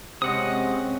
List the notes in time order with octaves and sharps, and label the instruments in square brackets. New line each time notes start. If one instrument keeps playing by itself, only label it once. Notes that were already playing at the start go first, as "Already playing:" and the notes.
[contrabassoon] C3 [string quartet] G#3 C#4 [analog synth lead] C4 [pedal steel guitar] D#5 F#5 D#6